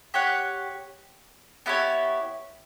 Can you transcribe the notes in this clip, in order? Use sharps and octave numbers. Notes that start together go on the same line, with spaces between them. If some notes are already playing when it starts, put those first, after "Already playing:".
G4 C#5 F#5
B3 E4 G4 C#5